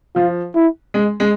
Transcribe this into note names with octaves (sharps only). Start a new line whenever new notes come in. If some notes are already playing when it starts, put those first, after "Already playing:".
F3 F4
E4
G#3
G#3